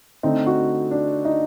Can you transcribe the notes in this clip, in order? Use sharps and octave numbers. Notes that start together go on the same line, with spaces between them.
D3 A3 C4 D#4
F#4
D4
D#4